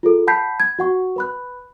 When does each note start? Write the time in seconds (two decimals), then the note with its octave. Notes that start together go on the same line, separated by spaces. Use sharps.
0.03 F4 G#4 A4
0.27 F#5 A5 B5 G6 B6 C7
0.60 G#6
0.79 F#4 F#5 C#6
1.16 B4 B5 F#6